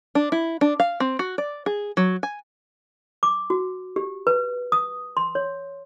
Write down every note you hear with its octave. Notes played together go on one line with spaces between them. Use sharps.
D4
E4
D4
F5
C4
F#4
D5
G#4
F#3
G#5
D6
F#4
G4
B4
D#6
C6
C#5